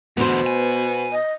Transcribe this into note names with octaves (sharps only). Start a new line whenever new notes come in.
E2 B2 D3 B3 C5
G#5
D#5